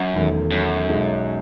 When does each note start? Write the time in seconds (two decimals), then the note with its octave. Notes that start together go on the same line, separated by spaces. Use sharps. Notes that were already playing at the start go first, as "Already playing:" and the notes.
Already playing: F#2
0.13 E1 E2 D#3 A3
0.52 F#2
0.89 B1 B2 G#3 D#4 F#4